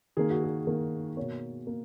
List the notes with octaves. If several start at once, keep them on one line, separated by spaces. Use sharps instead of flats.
D#3 A#3 G#4
F#4
G#4
D#3 A#3
B2 A#3 C#5
A#3